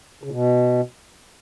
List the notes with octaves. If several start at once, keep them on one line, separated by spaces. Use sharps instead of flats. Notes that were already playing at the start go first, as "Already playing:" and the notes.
C#3
B2